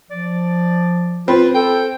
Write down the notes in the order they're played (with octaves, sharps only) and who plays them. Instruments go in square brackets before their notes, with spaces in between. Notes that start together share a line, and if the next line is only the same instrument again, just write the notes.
[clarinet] F3 [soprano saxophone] D5
[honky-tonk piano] C4 [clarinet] F4 [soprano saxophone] B4
[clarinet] A4 [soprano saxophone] G5